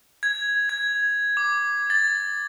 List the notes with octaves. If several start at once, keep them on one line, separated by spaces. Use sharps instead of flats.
G#6
G#6
D6
A6